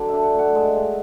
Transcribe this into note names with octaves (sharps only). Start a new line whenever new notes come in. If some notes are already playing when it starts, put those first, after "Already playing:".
Already playing: D3 F#3 D5
D4 E5
F#5
A3
F#5
G#3
G#3